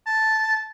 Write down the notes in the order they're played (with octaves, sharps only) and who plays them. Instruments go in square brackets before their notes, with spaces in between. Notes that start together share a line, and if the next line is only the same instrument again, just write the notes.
[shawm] A5